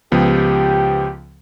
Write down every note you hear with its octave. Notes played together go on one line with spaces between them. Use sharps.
C#2 F3 B3 G4